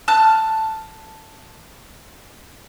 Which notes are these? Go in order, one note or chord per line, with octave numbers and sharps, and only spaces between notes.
A5 F6 F#6